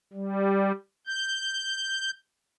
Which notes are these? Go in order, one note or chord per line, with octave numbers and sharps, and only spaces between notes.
G3
G6